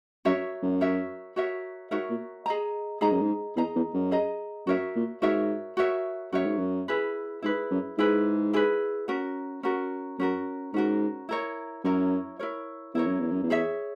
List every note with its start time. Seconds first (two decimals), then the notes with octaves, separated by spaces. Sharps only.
0.25 F#2 F#4 A#4 C#5 E5
0.62 F#2
0.81 F#4 A#4 C#5 E5
1.36 F#4 A#4 C#5 E5
1.91 G#2 F#4 A#4 C#5 E5
2.10 A#2
2.46 G#4 D#5 A#5
3.01 G#2 G#4 D#5 A#5
3.12 F#2
3.22 G#2
3.56 E2 G#4 D#5 A#5
3.76 E2
3.94 F#2
4.11 G#4 D#5 A#5
4.67 F#2 F#4 A#4 C#5 E5
4.95 A#2
5.22 G#2 F#4 A#4 C#5 E5
5.77 F#4 A#4 C#5 E5
6.33 F#2 F#4 A#4 C#5 E5
6.46 G#2
6.58 F#2
6.88 E4 G#4 B4
7.42 G#2 E4 G#4 B4
7.71 F#2
7.98 G#2 E4 G#4 B4
8.53 E4 G#4 B4
9.08 C#4 F#4 A#4
9.63 C#4 F#4 A#4
10.19 F#2 C#4 F#4 A#4
10.74 G#2 C#4 F#4 A#4
11.29 E4 A#4 C#5
11.85 F#2 E4 A#4 C#5
12.39 E4 A#4 C#5
12.94 E2 E4 A#4 C#5
13.07 F#2
13.19 E2
13.31 F#2
13.43 E2
13.50 G#4 C#5 E5